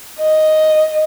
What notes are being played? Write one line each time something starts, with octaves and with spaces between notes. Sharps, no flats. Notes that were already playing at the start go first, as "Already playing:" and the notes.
D#5